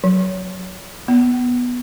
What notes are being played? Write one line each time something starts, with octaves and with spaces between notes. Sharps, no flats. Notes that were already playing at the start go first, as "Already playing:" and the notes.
F#3
B3